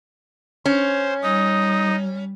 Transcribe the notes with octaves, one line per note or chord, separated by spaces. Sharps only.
C#4 C5
G3 D#4 D#6